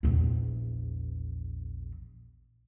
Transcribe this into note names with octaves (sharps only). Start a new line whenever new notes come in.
A#1 E2